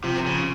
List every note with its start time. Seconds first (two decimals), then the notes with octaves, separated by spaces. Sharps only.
0.03 C3 F3
0.26 C#3